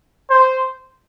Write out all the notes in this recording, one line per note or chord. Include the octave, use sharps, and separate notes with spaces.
C5